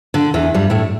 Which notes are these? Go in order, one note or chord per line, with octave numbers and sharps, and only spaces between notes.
D3
E2 E3
G2 G3
A2 A3